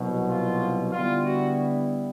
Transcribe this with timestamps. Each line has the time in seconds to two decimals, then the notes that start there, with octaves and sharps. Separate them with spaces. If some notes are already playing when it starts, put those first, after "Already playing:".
Already playing: C2 B2 F#3
0.27 F4
0.92 D3 G3 B3 E4 F4
1.25 F#4